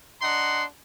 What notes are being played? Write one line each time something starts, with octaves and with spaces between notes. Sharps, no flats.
D4 D#5 F#5 A#5 C6